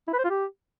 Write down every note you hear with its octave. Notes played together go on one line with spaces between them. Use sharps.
E4
B4
C5
F4
G4